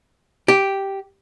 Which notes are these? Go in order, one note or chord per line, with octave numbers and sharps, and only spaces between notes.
G4